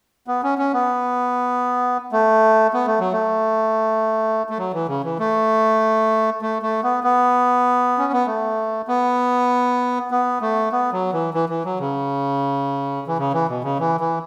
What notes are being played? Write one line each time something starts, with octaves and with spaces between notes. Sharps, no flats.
B3
C#4
C#4
B3
A3
B3
A3
F#3
A3
A3
F#3
E3
C#3
E3
A3
A3
A3
B3
B3
C#4
B3
A3
B3
B3
A3
B3
F#3
E3
E3
E3
F#3
C#3
E3
C#3
E3
B2
C#3
E3
E3